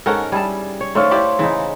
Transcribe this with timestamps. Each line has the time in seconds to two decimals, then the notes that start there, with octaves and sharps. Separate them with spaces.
0.06 G#2 C#4 A4 A#4 C#5 F#5
0.32 G3 E4 G#4 G#5 A5
0.81 C#5
0.95 D#3 A3 D4 A4 C5 C#5 F5
1.11 E4 G4 D5
1.39 C#3 E3 D#4